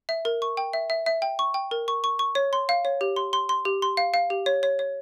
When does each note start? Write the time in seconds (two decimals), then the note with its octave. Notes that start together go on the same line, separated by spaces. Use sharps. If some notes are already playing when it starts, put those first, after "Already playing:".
0.09 E5
0.25 A#4
0.42 C#6
0.57 G5
0.73 E5
0.90 E5
1.06 E5
1.22 G5
1.39 C#6
1.54 G5
1.71 A#4
1.88 C#6
2.04 C#6
2.19 C#6
2.35 C#5
2.53 C6
2.69 F5
2.85 C#5
3.01 G4
3.16 C6
3.33 C6
3.49 C6
3.65 G4
3.82 C6
3.97 F5
4.14 F5
4.30 G4
4.46 C#5
4.63 C#5
4.79 C#5